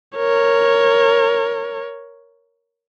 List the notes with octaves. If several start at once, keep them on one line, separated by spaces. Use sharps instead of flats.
A#4 C#5